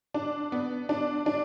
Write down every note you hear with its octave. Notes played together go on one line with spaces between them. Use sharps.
D4
B3
D4
D4